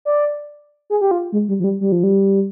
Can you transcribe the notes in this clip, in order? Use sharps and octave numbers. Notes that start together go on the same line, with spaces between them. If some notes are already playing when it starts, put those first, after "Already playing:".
D5
G#4
G4
F4
G#3
G3
F3
G3
G3
F3
G3